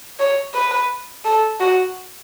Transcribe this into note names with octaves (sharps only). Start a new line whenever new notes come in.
C#5
B4
A4
F#4